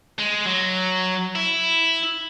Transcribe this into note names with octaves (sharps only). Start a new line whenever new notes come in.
G#3
F#3
E4